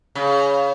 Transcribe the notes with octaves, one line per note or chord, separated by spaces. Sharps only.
C#3